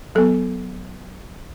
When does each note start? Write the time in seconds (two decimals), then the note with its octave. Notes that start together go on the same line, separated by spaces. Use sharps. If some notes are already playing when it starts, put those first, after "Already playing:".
0.15 F#3 B3 A4